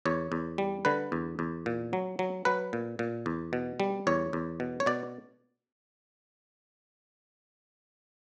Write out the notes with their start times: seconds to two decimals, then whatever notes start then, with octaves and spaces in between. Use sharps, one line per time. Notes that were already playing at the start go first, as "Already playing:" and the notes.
0.06 E2 C#5
0.32 E2
0.58 G3
0.85 D3 B4
1.12 E2
1.39 E2
1.66 A#2
1.93 F#3
2.19 F#3
2.45 F#3 B4
2.73 A#2
2.99 A#2
3.26 E2
3.53 B2
3.80 G3
4.07 E2 C#5
4.33 E2
4.60 B2
4.80 C#5
4.86 B2 D5